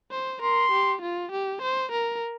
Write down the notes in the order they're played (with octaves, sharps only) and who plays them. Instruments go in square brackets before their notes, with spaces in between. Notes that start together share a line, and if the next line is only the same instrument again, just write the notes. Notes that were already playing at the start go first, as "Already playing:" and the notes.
[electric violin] C5
[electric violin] A#4 [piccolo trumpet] C6
[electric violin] G4
F4
G4
C5
A#4